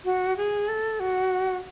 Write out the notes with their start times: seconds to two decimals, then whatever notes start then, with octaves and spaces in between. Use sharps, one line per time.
0.05 F#4
0.37 G#4
0.68 A4
1.00 F#4